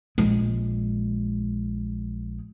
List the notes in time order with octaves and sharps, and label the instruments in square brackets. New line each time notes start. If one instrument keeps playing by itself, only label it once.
[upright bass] A#1 G#3